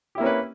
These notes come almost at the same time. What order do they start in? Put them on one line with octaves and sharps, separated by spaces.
G4 E4 A#3 C#4 B4